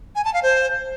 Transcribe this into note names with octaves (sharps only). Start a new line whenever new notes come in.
G#5
A5
F5
C5